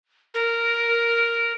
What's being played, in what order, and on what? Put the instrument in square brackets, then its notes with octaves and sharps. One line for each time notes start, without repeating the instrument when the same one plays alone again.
[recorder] A#4